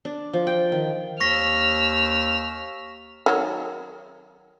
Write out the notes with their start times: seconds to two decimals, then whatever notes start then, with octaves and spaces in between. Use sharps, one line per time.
0.05 D4
0.33 F3
0.47 G5
0.72 D#3
1.20 D#2 C#6 E6 F6 A#6 B6
3.26 D#3 F#3